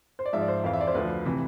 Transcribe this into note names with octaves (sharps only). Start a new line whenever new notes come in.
C5
D5
G#2 F3 E5
D5
C5
F2 E3 F5
E5
D5
C5
D2 D3 F3 B4
C3 E3